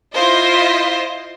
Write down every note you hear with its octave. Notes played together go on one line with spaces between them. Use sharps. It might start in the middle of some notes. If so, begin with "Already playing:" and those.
E4 F4 C5 D#5